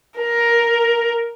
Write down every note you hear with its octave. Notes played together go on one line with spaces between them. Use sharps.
A#4